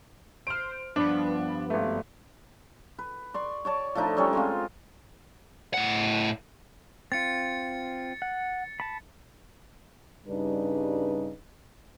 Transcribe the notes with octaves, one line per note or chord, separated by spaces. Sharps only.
C5 F6 D7
G2 F3 B3 D4
G#1 A3
B4
D5 C6 C#6
C#5 D5 A5
F3 A3 D4 D#4
G3 C#4 A4 C#5
G#3 C4 F4
A2 F#5
C4 F4 A6 C#7
F#5
A5 B5
G2 C#3 G3 D4 D#4 B4